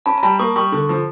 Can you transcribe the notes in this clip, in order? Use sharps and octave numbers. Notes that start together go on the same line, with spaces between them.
C#4 A5 B5
A#5
G3 A5 B5
A#3 C#6 D#6
G3 C#6 D#6
D3
F3